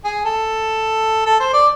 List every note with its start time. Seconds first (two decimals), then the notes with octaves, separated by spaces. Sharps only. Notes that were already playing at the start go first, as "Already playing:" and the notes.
0.05 G#4
0.25 A4
1.26 A4
1.40 C5
1.53 D5